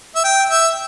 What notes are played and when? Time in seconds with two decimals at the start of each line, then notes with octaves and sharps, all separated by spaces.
0.16 E5
0.24 G5
0.50 E5